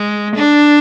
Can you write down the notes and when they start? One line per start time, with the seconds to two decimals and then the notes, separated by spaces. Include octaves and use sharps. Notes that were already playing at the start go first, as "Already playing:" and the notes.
Already playing: G#3
0.35 D4